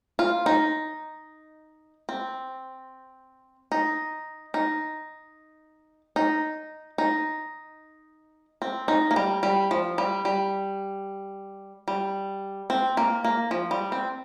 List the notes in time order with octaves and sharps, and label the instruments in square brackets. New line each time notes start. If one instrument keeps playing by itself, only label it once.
[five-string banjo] F4
D#4
C4
D#4
D#4
D#4
D#4
C4
D#4
A#3
G3
G3
F3
G3
G3
G3
C4
A#3
A#3
F3
G3
C4